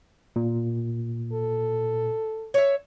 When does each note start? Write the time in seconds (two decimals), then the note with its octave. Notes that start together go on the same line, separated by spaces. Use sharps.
0.36 A#2
1.33 A4
2.54 C#5 E5